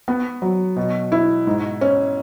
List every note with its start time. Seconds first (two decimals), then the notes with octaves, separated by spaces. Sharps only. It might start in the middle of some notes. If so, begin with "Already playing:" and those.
0.08 B3
0.42 F#3
0.76 B2
1.12 E4
1.47 G#2
1.81 C#4